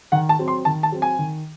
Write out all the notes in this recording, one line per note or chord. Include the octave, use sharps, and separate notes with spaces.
D#3 F#5
A5
F#3 C4
C6
D#3 A5
A5
F#3 C4
G#5
D#3